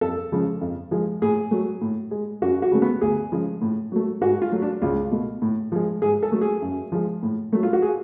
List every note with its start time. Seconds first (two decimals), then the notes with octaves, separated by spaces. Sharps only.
0.01 F2 A4
0.32 C#3 F3 G#3
0.61 F2
0.91 F3 G#3
1.22 A2 G#4
1.51 F#3 A3
1.82 A2
2.11 G#3
2.42 F#2 F#4
2.62 F#4
2.72 C#3 F#3 A3
2.82 B3
3.01 D2 G#4
3.32 C#3 F3 G#3
3.62 A2
3.92 F#3 A3
4.21 G#2 F#4
4.42 F4
4.52 F#3 A3
4.62 D4
4.82 C#2 F4
5.11 B2 A3
5.42 A2
5.72 F3 G#3
6.02 G#2 G#4
6.23 A4
6.32 F#3 A3
6.41 G#4
6.62 F#2
6.92 F3 G#3
7.23 A2
7.53 F#3 A3
7.63 F4
7.73 F#4
7.82 G#4